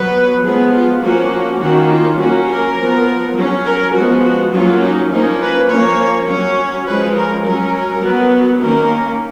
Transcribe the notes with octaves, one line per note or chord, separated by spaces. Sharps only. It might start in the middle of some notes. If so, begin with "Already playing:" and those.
Already playing: F#3 B3 B4
F3 G#3 B3 G#4
F4
F3 A#3 C#4 F#4
D#3 A#3 C#4 F#4
F4
F#3 A#3 C#4 F#4
A#4
F3 B3
F#3 C#4
A#4
F3 G#3 B3 F#4
F#4
F#3 A#3 C#4 F4
D#4
F3 A#3 C#4 D#4
B4
F3 A#3 C#4 C#5
F#3 C#4 C#5
F3 G#3 C#4 B4
A#4
F#3 C#4 A#4
F#3 B3
D#3 A#3 C#4 A#4